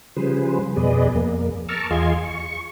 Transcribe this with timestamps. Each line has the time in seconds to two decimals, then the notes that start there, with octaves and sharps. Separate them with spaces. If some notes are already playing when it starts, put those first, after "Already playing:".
0.16 C#3 F3 G3 G#4 B4 C5
0.76 F2 B2 G#4 B4 D5 D#5
1.15 F2 A#3
1.69 A5 A#5 C#6 D6 E6 F6
1.91 E2 F4 G#4 D#5 C6 G#6
2.23 C#6